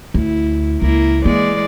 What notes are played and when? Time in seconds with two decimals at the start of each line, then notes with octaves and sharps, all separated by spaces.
0.14 D2 E4
0.82 C#2 A#3 E4 A#4
1.25 E3 G#3 A#3 D5